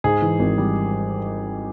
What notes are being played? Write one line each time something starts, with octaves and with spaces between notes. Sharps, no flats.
G#2 G#4
E3
G#1
G3